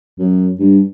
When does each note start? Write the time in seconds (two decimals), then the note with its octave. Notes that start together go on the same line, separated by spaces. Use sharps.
0.19 F#2
0.59 G2